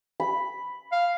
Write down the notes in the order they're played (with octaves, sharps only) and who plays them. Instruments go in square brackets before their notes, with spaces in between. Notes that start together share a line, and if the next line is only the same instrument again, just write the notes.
[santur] B5
[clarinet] F5